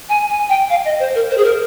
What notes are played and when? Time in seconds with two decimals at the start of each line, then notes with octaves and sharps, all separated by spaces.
0.09 G#5
0.30 G#5
0.49 G5
0.70 F5
0.85 D#5
0.99 C5
1.15 A#4
1.30 C5
1.38 G#4
1.44 A#4